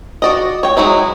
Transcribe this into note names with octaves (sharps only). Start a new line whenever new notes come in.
F#4 D5 D#5
C#5 G5
F#3 G#3 D#4 E4